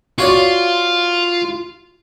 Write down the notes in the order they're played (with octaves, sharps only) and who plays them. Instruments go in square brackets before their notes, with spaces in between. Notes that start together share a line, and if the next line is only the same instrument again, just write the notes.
[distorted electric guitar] F4 [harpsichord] F#4 C#5 D5